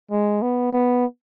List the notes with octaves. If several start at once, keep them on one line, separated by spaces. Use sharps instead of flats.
G#3
B3
B3